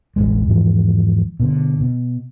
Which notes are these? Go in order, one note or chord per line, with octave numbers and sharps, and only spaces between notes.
E1 A1 F#2 G#3
E2 G#2 E3 F3
B2 D3
B2